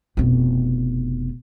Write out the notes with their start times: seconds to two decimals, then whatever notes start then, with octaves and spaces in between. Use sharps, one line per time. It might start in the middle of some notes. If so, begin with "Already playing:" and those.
0.17 F1 B2